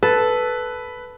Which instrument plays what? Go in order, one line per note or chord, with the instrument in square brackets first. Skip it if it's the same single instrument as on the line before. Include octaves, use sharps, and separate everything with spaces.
[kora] A4 [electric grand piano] B4